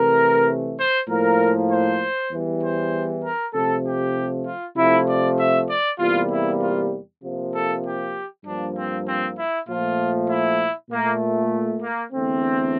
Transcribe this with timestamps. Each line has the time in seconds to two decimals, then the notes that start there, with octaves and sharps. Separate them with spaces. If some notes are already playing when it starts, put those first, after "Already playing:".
Already playing: C3 E3 A3 A#4
0.78 C5
1.08 A2 F3 A#3 A#4
1.70 C5
2.31 E2 E3 G3
2.62 C5
3.23 A#4
3.53 C3 F3 A3 A4
3.85 G4
4.45 F4
4.76 C3 F3 A3 E4
5.06 D5
5.37 E5
5.68 D5
5.98 E2 C3 G3 A#3 F4
6.29 E4
6.60 F4
7.22 C3 F3 A#3
7.53 A4
7.83 G4
8.44 G2 F3 A#3 D4
8.75 C4
9.06 C4
9.36 E4
9.67 A#2 F3 A3 F4
10.29 E4
10.90 A#2 A3 A#3
11.81 A#3
12.12 E2 D3 A3 C4